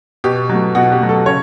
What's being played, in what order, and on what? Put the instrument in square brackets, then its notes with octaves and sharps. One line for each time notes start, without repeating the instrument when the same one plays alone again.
[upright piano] B2 G4
F#3 A3
B2 F#4
G4
F#3 A3
A4
C#3 C#5